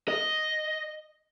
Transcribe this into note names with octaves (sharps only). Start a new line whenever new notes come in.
D#5